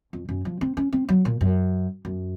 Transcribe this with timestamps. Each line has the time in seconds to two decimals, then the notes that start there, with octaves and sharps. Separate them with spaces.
0.13 F2
0.29 F#2
0.45 F3
0.61 C4
0.77 C#4
0.93 C4
1.09 F#3
1.25 A#2
1.41 F#2
2.05 F#2